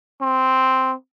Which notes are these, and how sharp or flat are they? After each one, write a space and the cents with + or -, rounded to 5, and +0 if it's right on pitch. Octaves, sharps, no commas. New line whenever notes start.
C4 -5